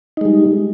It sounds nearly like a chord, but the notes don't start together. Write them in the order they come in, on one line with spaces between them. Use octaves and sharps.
D#4 G#3 G3